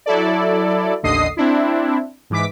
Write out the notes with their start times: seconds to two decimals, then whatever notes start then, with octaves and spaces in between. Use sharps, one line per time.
0.06 F#3 E4 A4 D5
1.03 A1 D#2 D3 D#5 D#6 C7
1.37 C4 D4 E4
2.30 G#2 E3 D6 B6